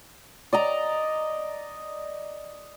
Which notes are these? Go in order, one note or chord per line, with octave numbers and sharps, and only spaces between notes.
D5 D#5 A#5